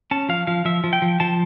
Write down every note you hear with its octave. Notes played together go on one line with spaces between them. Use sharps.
C#4 A5
F3 F5
F3 F5
F3 E5
F3
G5
F3
F3 A5